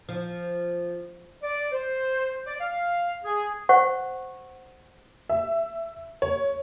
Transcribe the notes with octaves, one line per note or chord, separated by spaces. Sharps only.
F3
D5
C5
D5
F5
G#4
C5 F#5 C#6
E5
C#5